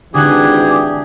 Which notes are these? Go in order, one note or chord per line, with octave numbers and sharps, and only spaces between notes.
G#1 D3 E3 D4 G4 G#4 G#5 F#6